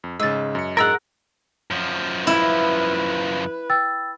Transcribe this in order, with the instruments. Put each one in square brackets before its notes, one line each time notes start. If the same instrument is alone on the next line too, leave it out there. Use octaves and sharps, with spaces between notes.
[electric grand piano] F2
[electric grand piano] G#2 C#3 [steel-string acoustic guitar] G#3 [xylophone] E6 A6
[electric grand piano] F#2 C#7
[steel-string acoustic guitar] G#2 D3 [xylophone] G#4 E6 A6 [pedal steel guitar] A#4 F#5
[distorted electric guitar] F#2 F3
[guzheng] E4 [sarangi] B4
[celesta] G5 E6 A6